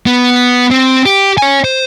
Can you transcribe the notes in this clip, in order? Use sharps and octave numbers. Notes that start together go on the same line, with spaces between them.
B3
C4
G4
C#5 G#5
C5